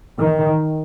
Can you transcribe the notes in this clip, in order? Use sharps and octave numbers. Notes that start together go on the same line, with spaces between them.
D#3